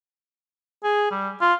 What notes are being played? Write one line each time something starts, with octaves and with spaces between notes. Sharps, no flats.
G#4
G3
F4